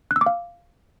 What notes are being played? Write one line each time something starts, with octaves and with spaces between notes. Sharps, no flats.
F#6
E6
D6
F5